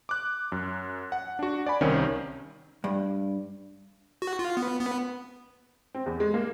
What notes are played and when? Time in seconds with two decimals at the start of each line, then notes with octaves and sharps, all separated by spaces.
0.09 D6 F#6
0.52 F#2
1.12 F#5
1.39 D4 F#4
1.66 D5 G#5 B5
1.81 C2 D#3 C4 C#4
2.84 G2
4.22 F#4
4.39 F4
4.57 B3
4.81 B3
5.94 C4
6.06 E2
6.20 G#3
6.34 A#3